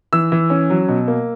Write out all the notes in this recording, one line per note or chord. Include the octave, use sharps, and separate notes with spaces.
E3 E6
E3
C#4
F#3
B2
A#3